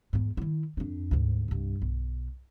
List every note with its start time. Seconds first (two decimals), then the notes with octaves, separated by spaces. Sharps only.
0.13 E2 G#2
0.37 D#3 E4
0.77 F2 D4
1.11 D2 G#2
1.48 C2 G2
1.82 B1